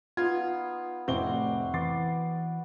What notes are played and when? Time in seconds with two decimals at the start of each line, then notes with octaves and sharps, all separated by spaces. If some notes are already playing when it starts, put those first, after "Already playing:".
0.17 B3 D#4 F4 G#6
1.08 F1 A2 A#3 C4 F#4 D5 G7
1.74 E3 B3 D6 A6 C7